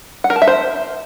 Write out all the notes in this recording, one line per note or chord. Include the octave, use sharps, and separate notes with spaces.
F#5
A#4
A5
E5
C5